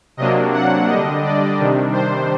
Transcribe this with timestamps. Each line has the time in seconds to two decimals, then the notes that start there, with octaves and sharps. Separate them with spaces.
0.17 C3 F#3 A#3 D4 D#5
0.53 F#5
0.87 D3 G3 D4 D#5
1.23 D5
1.57 C3 D#3 G3 D4
1.93 C5